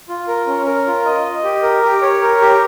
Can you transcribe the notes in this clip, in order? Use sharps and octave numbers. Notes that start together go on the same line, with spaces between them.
F4
A#4
C#4
A#4
F4
D#5
D#5
G4
A#4
G4
C#5
A#4
G4